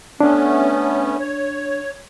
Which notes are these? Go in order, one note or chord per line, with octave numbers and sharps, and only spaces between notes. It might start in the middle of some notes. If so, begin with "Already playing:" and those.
A3 B3 C#4 D4
C#5